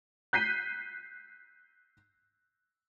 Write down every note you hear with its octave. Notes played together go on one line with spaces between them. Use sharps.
F#6 G6 B6 C7 D#7